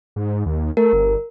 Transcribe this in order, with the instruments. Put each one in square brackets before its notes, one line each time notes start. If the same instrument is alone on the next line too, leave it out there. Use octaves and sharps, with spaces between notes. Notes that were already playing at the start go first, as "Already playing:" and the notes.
[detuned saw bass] G#2
D#2
[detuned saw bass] A3 [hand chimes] A#4
[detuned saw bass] G1